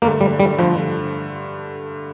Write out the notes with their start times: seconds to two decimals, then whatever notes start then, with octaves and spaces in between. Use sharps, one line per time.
0.02 G2 D3 A3 A#3
0.21 G3
0.40 G3
0.58 G2 D3 F3 A3